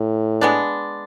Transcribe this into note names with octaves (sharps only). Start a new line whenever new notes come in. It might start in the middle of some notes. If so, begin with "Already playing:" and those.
Already playing: A2
G#3 B3 D4